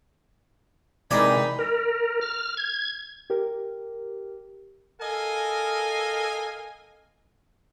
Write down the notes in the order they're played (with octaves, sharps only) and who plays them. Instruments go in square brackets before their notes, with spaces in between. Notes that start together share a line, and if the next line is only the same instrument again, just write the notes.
[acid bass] C3 [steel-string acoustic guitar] E3 G#3 A#4 [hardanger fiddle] D#4 B5 [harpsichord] D5 G#5
[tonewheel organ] A#4
F6
G#6
[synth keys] G4 A#4
[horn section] A4 A#4 D#5 F5 G#5